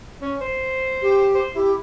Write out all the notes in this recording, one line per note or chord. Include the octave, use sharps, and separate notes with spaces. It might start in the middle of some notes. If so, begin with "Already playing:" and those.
C#4
C5
G4
C5
E4 G4